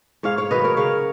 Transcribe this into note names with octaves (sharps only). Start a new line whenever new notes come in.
G#2 C#5 F5
C#5 F5
D#3 F#3 B4 D#5
A#4 C#5
C#3 C#5 F5